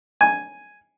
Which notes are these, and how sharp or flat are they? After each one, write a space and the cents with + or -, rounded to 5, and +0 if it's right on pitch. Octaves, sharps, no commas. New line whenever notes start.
G#5 +0